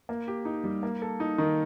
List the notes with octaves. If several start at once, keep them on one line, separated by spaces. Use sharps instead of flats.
A#3
G4
D#4
G3
A#3
A4
D#4
D#3